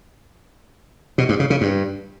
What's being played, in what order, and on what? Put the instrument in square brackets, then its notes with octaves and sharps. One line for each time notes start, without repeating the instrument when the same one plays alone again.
[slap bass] B2
G2
C#3
C#3
G2